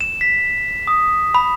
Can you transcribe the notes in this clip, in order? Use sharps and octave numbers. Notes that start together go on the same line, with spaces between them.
E7
B6
D#6
B5